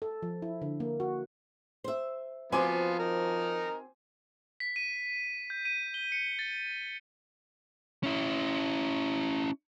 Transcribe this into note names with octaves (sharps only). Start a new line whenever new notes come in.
A4
F3
E4
D3
A#3
F#4
C5 E5
F3 B3 C4 F4 F#4 G#5 C6 D6
D#4 A#4
B6
D#7
G6
D#7
G7
C#7
A6
C#4 E4